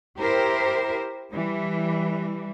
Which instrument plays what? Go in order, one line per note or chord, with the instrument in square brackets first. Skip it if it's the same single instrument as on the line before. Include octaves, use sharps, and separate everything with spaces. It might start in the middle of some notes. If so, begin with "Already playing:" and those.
[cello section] E4 G4 A#4 C5
E3 G3